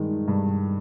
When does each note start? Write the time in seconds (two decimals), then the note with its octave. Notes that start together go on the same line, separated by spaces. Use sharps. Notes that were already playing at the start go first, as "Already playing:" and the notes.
Already playing: G2 D#3 G#3
0.28 G2